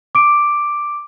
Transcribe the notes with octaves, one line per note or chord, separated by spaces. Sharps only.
D6 D7